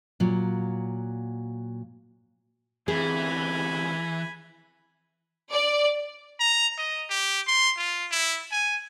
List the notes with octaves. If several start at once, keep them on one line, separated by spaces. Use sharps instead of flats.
A#2 F#3
D2 C3 E3 G#4 G#5 B5
D5
A#5
D#5
G4
C6
F4
E4
G#5